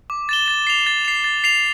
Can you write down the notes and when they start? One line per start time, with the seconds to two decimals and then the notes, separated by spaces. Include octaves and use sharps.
0.10 D6
0.29 A6 E7 G7
0.48 A6
0.67 C7 F7
0.87 A6
1.05 C7 F7
1.24 A6
1.44 C7 F7